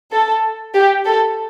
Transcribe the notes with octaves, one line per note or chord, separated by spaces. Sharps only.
A4
G4
A4